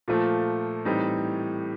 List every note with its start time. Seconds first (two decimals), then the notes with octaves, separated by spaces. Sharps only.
0.08 A#2 F3 A3
0.85 A2 E3 G3 C4 D#4